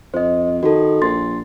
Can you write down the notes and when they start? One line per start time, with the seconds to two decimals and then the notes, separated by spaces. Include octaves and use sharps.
0.14 F2 C5 D#5
0.63 D#3 F#4 A4
1.02 A#1 C6 A6